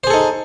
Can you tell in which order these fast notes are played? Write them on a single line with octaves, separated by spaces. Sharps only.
C5 G#4 A4 D#4